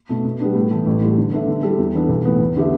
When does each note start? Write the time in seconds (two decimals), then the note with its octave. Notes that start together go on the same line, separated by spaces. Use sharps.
0.09 B2 A3
0.25 B2
0.40 G3 B3 D4
0.55 A2
0.71 E3 A3
0.86 A1
1.01 A2 G3
1.18 D3
1.32 B3 D4 A4 E5
1.47 D3
1.63 G3 E4 A4
1.78 E2
1.94 E3 B3 D4 A4
2.09 B1
2.25 A2 E3 B3
2.40 E2
2.56 D3 B3 G4 E5